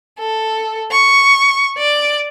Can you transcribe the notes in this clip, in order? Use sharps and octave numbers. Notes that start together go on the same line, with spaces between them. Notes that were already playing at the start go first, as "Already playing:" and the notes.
A4
C#6
D5